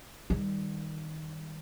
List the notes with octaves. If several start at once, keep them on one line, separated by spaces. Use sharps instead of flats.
D#3 G3